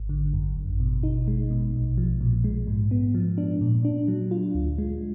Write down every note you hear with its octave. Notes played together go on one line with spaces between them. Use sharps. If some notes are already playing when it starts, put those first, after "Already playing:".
Already playing: G#1
D3
F#2
G#1
B2
D#4
G#3
B2
A#1
F3
A#2
G#3
G#2
B3
F3
D4
A#2
D4
F#3
F4
D2
G#3